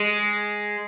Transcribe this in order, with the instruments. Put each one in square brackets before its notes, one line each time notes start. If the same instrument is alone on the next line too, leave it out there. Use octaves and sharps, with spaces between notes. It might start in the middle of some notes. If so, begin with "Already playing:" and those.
Already playing: [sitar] G#3